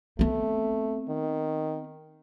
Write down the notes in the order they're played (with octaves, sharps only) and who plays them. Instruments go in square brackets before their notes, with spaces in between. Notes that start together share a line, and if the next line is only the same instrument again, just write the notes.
[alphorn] A3 [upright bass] B3 C4
[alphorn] D#3